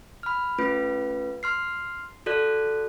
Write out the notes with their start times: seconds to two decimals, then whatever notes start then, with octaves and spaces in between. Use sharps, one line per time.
0.23 B5 F6
0.58 A3 C#4 F4 B4
1.43 C6 F6 C7
2.26 F#4 A4 D5 F#6